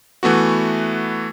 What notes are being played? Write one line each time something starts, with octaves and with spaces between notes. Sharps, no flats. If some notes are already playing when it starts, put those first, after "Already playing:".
E3 A3 B3 F#4